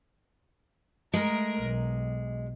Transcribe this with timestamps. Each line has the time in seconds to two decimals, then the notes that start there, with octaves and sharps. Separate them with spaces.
1.14 G#3 A3 A#4
1.64 B1